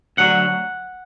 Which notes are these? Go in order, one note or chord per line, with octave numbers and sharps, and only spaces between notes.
D2 D3 F#3 F#5